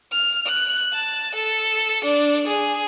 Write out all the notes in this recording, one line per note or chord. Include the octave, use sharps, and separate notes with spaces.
F6
F#6
A5
A4
D4
G#4